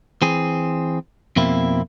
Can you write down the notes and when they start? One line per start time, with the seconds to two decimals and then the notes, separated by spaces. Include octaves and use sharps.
0.22 E3 C4 G#4
1.36 F2 B2 A#3 C4 E4